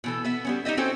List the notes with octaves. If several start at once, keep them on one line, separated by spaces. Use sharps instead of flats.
B2 E3 A4
B3 E5
G3 B3 C#4
D#4 G4 D#5 E5
C4 C#4 F#4 A4 C5 G5